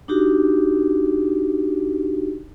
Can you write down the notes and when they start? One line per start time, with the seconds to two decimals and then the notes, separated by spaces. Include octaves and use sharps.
0.08 D4 D#4 F#4 G4